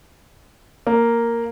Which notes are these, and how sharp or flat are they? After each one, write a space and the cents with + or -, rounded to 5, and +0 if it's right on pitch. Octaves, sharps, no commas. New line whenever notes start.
A#3 -5